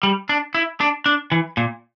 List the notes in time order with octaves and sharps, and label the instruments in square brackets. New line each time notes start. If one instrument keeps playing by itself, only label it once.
[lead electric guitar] G3
D4
E4
D4
D4
E3
A#2